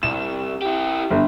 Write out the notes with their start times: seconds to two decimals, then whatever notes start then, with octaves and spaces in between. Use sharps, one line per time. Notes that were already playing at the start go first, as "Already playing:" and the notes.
0.03 C2 E7
0.62 E4 G4
1.11 G1